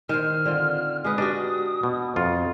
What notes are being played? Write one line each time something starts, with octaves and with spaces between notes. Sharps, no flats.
D#3 C5 F6
D3 C4 F4
G#3 B4 D#6
D4 F#4 G4 D#5
B2
F2 F4